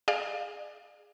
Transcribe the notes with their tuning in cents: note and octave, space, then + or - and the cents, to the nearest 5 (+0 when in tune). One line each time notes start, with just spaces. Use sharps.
G#4 +0 D5 +35 F5 +10